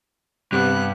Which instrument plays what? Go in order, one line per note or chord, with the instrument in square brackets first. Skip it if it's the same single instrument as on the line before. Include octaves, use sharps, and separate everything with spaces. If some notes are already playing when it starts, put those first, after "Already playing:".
[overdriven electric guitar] G2 [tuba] C3 [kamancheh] B3 F#6